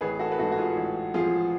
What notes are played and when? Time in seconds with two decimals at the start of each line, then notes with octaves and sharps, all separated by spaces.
0.01 A1 G#4 B4
0.19 F#4 A4
0.32 B4
0.38 G#2 F#4 A4
0.52 F#4
0.58 F4 G#4
0.76 A1
1.14 F3 F4 G#4